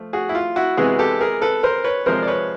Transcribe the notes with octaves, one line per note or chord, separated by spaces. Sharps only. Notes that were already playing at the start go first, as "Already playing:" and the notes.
Already playing: F3 A3
F#4 G#4
E4
F4
E4 F#4
C3 E3 G#3 B3 F#4 G#4
G4 A4
G#4 A#4
A4 B4
A#4 C5
B4 C#5
C3 F3 G#3 A#4 C5
D5
B4 C#5